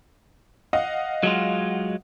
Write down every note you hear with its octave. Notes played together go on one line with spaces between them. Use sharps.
D#5 F5 F#5
F#3 G#3 F4